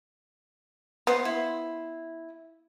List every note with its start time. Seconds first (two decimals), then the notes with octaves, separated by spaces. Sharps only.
1.07 B3 C5 D#6
1.25 E4